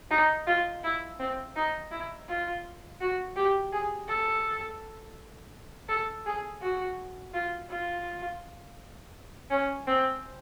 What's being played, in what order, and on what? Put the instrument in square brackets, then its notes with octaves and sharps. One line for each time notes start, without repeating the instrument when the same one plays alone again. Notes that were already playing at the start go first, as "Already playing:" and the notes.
[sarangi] D#4
F4
E4
C4
D#4
E4
F4
F#4
G4
G#4
A4
A4
G#4
F#4
F4
F4
C#4
C4